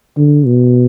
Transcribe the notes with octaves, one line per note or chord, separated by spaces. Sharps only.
D3
B2